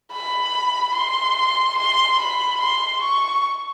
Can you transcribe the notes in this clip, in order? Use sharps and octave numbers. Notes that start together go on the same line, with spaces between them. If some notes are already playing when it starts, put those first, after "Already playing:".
B5
C6
C6
B5
C6
C#6